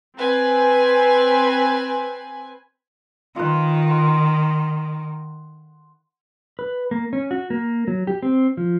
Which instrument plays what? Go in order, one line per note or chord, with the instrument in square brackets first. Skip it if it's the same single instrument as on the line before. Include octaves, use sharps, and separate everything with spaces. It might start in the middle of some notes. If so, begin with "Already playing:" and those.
[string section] C4 B4 G#5
[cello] D#3 [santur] F4 B4
[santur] F#5 C6
[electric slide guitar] B4
A#3
C#4
F#4
A#3
F#3
G4
C4
F3